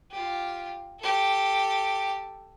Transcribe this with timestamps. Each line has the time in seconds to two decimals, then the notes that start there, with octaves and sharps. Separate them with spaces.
0.11 F4 G4
1.00 G4 A4